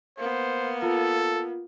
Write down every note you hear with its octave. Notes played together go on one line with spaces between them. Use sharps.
A#3 B3 C5
F4 A4